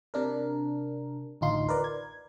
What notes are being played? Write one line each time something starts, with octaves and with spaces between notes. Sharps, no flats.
C3 D4 A#4
A1 D2 D#4 F4 C6
A#4 B4 D5
G#6